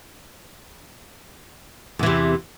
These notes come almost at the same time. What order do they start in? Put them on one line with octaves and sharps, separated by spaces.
E2 E3 C3